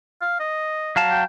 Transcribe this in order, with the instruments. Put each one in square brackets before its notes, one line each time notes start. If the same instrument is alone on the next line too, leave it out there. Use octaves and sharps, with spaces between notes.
[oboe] F5
D#5
[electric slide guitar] F#3 F5 A5
[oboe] G5